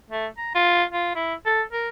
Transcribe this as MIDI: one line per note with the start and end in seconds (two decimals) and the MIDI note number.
0.11 0.27 57
0.38 0.54 82
0.55 0.84 65
0.93 1.11 65
1.15 1.34 64
1.46 1.62 69
1.72 1.89 70